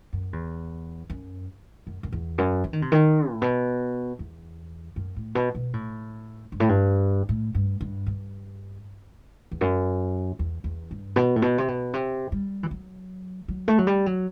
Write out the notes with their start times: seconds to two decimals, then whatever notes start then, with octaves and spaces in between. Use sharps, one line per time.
0.13 F#2
0.33 E2
1.10 F#2
1.87 F#2
2.03 F#2
2.12 E2
2.38 F#2
2.64 E3
2.73 D#3
2.82 C3
2.92 D#3
3.31 A2
3.42 B2
4.19 E2
4.96 F#2
5.16 A2
5.35 B2
5.55 B2
5.73 A2
6.52 G2
6.60 A2
6.69 G2
7.29 A2
7.55 G2
7.81 G2
8.06 G2
9.51 E2
9.61 F#2
10.39 E2
10.64 E2
10.91 G2
11.16 B2
11.36 A2
11.42 B2
11.58 C3
11.68 B2
11.93 C3
12.32 G3
12.63 E3
12.71 F#3
13.48 F#3
13.68 A3
13.78 F#3
13.87 G3
14.06 F#3